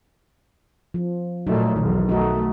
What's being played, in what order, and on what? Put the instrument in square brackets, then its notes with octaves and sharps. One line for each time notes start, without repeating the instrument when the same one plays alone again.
[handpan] F3
[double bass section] A#2 A3 [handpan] F#3 D#4
[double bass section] B1 E2 [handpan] D#3
[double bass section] A3 [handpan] D#4 F#4